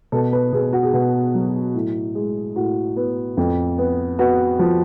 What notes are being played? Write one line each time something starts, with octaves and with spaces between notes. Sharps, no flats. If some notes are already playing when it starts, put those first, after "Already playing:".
B2 A4
B4
B2 G#4
F#4
G#4
B2 F#4
F#3
A2
G#3
A2 F#4
B3
F2
B3
B3 F#4
F3